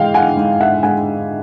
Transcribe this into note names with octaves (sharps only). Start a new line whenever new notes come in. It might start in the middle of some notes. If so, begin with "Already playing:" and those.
Already playing: E3 G#3 F5 G5
F#5 G#5
G#2
E5 F#5
G#3 F#5 G#5